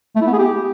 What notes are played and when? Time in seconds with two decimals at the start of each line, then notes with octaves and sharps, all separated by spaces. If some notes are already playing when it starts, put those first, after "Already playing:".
0.16 A3
0.22 E4
0.27 B3
0.33 G#4
0.39 G4